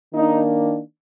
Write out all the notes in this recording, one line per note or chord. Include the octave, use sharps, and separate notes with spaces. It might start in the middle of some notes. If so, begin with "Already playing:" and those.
D#3 A#3 D4 D#4